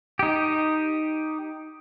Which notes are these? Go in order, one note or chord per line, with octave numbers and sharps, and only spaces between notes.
D#4 G4